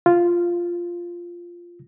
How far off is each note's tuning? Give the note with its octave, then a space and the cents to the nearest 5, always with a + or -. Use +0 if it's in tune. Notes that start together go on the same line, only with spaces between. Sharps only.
F4 -5